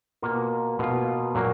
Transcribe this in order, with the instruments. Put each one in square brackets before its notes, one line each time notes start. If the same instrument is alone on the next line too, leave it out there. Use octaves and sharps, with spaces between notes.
[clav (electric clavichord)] B2 A#3 F4
B2 A#3 F4
A#2 F#3 A#3